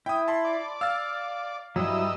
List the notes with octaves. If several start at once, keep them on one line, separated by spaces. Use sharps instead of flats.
E4 G5 D#6
A5 B5 C6
D5
F5 E6 F6 A6
G2 F#3 G3 E4 D#5 E6